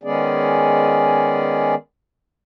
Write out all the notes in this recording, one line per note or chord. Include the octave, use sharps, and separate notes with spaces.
D#3 G#3 B3 C#4 G#4 D5